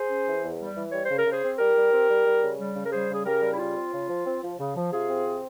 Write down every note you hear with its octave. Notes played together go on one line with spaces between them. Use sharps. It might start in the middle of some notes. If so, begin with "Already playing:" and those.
Already playing: G#4 C5
C#4
E3
E2
G3
E3
G3 C#5
C#3 C5
A#4
C#3
G#4 C5
C4
G3 G4 A#4
G3
C4
G3
G3
C#3
G3
C#3
A#4
G3 G#4 C5
C#3
G#4
C#3 G4 A#4
G3
E4
C#3 F4
C4
C#3
F3
C4
F3
C#3
F3
C3 F4 G#4
C4
C3